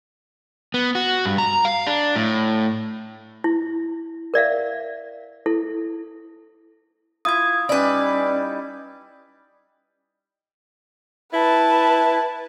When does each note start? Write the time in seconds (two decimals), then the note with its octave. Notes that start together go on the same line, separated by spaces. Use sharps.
0.74 B3
0.95 F#4
1.25 G2
1.38 A#5
1.65 F5
1.87 D4
2.16 A2
3.44 E4
4.34 A#4 D5 E5 F5
5.46 E4 A4
7.25 E4 F4 D#6 G#6
7.69 G3 C#4 D#4 E4 B4 D5
11.33 E4 B4 A5